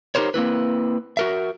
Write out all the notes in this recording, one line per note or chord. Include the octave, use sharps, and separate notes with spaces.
D#4 G4 A#4 C5 C#5
A#3 C4 E4 B4
F#4 A#4 E5